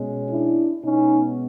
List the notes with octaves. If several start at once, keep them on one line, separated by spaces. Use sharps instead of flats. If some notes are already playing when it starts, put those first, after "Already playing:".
Already playing: B2 G#3 C#4
D4 E4
B2 G#3 B3 C#4 D#4